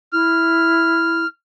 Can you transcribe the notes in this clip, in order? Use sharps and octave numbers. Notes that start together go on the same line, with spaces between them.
E4 F6